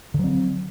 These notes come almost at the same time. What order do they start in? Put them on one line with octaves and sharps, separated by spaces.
D3 F#3 C4